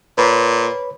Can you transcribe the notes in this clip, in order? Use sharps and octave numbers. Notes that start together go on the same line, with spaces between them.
A#2 B4 C#5 B5